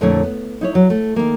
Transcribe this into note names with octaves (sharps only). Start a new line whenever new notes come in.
F2 A#2 D3 A3 E4 C#5
B3
D#4 E4 C#5
F#3
A3
D#3 A#3